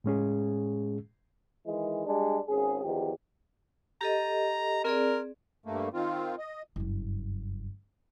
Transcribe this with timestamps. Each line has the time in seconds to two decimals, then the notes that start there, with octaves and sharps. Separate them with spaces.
0.04 A2 G#3 C#4 G#4
1.65 D#3 E3 G#3
2.05 G3 G#3 D4
2.48 G#1 C#4 G#4
2.82 E2 D#3 F3 G4
4.01 G4 A4 D#5 A#5
4.84 C4 G#4 A#4 D5
5.66 G2 A3 A#3
5.93 D#3 C4 F4
6.38 D#5
6.76 F#1 G2